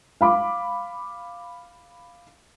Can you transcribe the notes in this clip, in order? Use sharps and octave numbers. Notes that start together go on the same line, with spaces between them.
F5 B5 D6